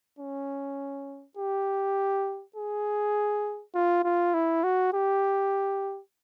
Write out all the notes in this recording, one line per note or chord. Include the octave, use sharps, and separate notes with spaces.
C#4
G4
G#4
F4
F4
E4
F#4
G4